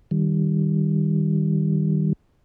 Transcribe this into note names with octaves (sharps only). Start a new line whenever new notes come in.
D#3 G3